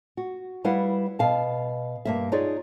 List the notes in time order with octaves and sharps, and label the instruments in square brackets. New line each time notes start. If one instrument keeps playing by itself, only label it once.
[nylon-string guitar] F#4
G3 E4 B4 F5 F#5
B2 F5 A5
G2 A#3 E5
D#4 F4 G#4 C#5 D5